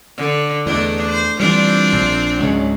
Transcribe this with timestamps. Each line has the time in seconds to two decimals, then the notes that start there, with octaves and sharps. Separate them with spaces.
0.17 D3
0.66 E2 A3 D4 D#4
1.07 C5
1.40 E3 G3 C4 D4 F4
1.93 A#1
2.40 C#2 G#2 C#3 F#3